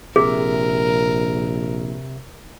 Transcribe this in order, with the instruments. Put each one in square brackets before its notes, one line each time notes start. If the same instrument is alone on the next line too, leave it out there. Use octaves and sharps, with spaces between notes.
[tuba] A#1 [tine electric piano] C3 E5 [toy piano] G#4 [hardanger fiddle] A#4